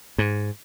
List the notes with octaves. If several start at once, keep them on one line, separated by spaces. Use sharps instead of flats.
G#2